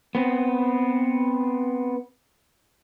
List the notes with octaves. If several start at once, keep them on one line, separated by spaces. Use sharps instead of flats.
B3 C4